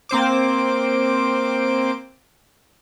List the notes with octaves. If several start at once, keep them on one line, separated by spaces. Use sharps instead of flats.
A#3 C4 C5 D6